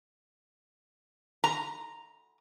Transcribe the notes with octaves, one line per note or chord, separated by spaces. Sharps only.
A#5